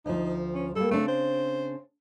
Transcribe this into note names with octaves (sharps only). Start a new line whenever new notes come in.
D2 F3 D#4
C#4
G3 A#3 A4
C#3 A3 C4 D4
C5